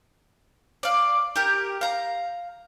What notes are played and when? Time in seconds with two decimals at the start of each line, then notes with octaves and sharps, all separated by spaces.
0.83 D5 F5
1.36 G4 A#4
1.81 F5 A#5